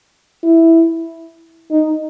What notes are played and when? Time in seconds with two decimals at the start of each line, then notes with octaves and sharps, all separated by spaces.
0.43 E4
1.71 D#4